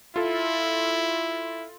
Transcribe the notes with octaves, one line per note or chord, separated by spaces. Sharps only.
E4 F4 A4